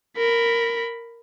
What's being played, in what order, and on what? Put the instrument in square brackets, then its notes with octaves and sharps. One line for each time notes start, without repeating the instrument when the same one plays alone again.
[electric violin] A#4 B5